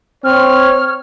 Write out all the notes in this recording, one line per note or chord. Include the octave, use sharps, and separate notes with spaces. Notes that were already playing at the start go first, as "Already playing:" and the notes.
C4 C#5 F6